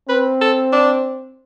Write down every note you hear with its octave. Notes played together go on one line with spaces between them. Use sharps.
C4 B4
A4
D4